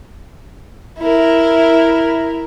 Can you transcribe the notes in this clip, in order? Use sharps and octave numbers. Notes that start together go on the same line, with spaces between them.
E4 A#4